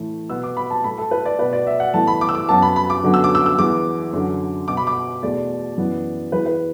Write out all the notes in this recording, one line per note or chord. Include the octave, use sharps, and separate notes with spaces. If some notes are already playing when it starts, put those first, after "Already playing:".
Already playing: A2 E3 A3
B2 B3 E6
D6
B5
A5
A2 A3 B5
A4
B4
D5
B2 B3 B4
D5
E5
F#5
A2 E3 B3 A5
B5
D6
E6
D6
F#2 F#3 B3 A5
B5
B5
D6
F#2 D3 F#3 B3
E6
D6
E6
E6
E2 E3 B3 D6
F#2 D3 F#3
B2 B3 D6
B5
D6
E2 B2 A3 D5
F#2 E3 B3
E2 E3 B3 B4
B4